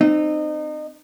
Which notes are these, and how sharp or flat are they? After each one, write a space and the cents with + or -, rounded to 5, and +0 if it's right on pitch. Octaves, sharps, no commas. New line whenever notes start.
C4 -10 D#4 -30